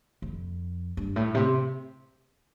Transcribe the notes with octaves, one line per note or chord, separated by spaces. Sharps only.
F2
G2
A2
C3